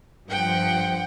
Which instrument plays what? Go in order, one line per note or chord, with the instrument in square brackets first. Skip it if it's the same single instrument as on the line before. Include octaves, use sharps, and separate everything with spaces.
[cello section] G2 F3 [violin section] F#5 G5